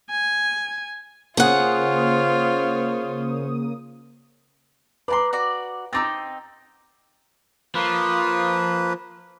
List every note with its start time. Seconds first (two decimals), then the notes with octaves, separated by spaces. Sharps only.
0.10 G#5
1.37 C#3 A#3 F4 G#4 C5 C#5 F#5 D#6
5.08 B4 D5 A5 A#5 C6
5.33 F#4 D5
5.93 C4 D#4 A#5 D6 E6 A6
7.75 F3 A#3 B4